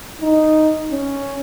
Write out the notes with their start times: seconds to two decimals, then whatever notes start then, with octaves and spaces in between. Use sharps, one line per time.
0.22 D#4
0.91 C#4